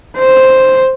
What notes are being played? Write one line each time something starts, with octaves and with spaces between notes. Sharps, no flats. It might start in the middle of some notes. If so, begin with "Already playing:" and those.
C5